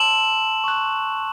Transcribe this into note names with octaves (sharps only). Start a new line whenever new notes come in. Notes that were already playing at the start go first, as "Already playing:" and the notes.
Already playing: A5 C6 E6 E7 F#7
C#6 F#6